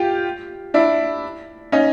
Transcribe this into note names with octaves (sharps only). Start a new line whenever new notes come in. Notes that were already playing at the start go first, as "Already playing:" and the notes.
Already playing: F4 G4
D4 E4
C#4 D#4